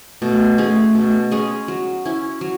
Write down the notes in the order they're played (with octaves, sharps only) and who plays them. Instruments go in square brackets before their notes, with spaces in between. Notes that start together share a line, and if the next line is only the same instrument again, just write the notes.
[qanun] B2 [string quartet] A3
[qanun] G#3 C#4 G#4 [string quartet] A3
[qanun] B2
G#3 C#4 G#4
F#3
C#4 E4
F#3